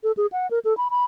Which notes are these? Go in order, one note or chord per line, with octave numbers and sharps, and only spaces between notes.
A4
G#4
F#5
A#4
A4
B5
B5